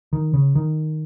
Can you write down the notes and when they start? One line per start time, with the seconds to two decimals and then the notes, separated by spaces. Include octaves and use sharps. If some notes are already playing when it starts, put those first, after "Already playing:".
0.13 D#3
0.34 C#3
0.55 D#3